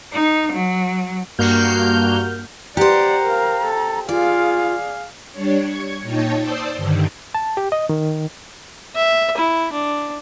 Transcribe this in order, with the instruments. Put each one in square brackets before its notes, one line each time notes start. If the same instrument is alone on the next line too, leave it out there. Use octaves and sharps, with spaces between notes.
[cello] D#4
F#3
[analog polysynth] G2 A#3 F#4 F6 G6
[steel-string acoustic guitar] G4 C5 [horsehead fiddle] D5 F#5 [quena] A#5
[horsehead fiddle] A#4 F5
A4
[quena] F4 [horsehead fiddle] G#4 F5 [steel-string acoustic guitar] D5
[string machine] G3 D4 C#5
C#6 G#6
A#2 D#4 C#5 G5 A5
C5 D5 A5 D#6 E6 G6
G2 D3 D#3
[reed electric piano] A5
G4
D#5
D#3
[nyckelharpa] E5
E4
D4